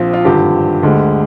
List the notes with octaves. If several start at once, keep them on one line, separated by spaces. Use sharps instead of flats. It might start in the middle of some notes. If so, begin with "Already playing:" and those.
Already playing: A#1 A#2 F3 C4 F4
F4
G#1 G2 D3 F3 G4
D2 D3 G#3